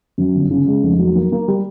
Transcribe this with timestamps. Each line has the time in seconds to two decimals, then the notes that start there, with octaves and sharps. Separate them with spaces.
0.18 F#2
0.35 G1
0.51 C#3
0.68 G#3
0.83 F1
0.99 F#3
1.15 A#3
1.32 A#3
1.48 G3